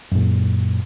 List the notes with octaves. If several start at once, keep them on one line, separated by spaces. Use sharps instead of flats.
F#2 A#2